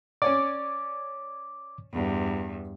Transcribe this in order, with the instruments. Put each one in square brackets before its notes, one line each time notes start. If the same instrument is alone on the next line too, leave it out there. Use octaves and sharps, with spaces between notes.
[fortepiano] C#4 C#5 D5 [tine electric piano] D6
[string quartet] E2 G2